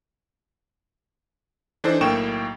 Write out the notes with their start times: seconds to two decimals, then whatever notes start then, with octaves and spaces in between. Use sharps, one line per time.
1.84 E3 D4 D#4 A4 C5
2.01 B1 A2 A#3 G5 C#6 E7